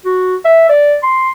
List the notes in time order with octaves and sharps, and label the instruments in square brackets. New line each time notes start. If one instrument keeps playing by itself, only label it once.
[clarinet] F#4
E5
D5
C6